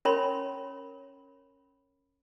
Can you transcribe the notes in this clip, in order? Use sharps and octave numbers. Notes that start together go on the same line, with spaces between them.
C#4 A#4 C#5 B5 C6